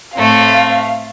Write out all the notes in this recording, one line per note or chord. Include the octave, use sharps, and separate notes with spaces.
A2 A3 C4 F5